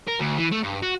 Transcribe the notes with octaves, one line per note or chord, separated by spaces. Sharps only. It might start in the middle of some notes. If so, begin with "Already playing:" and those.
A#4
D2
E3
A3
G2
F#4